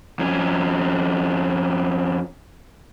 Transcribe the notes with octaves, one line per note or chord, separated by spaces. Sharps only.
F2 C#4